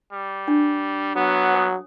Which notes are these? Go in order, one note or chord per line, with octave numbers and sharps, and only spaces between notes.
G3
D4
F#3 B3
C#5 G#5 D#6